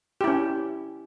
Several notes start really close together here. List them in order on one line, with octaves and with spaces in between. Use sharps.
G4 E4 C#4